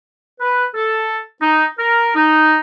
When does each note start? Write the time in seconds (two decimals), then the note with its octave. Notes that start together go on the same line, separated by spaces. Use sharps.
0.41 B4
0.74 A4
1.42 D#4
1.78 A#4
2.15 D#4